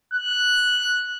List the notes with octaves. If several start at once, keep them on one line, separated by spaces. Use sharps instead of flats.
F#6